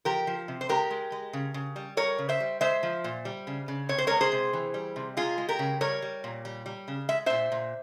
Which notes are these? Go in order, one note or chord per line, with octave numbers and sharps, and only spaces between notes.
F3 G4 A#4
F3
C3
C5
G#3 G4 A#4
G#3
G#3
C#3
C#3
G3
G3 A#4 C#5
C#3
C5 E5
G3
G#3 C5 E5
F3
A#2
G3
C#3
C#3
C3 C#5
C5
G#3 A#4 C#5
G#4 C5
C3
E3
G3
C3
G#3 F4 G#4
G#3
G4 A#4
C#3
G3 A#4 C#5
G3
A#2
G3
G3
C#3
G#3 E5
A#2 C5 E5
A#2